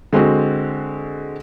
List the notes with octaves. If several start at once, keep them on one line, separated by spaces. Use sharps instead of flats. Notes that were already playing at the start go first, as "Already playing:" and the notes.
D3 G#3 C4 F#4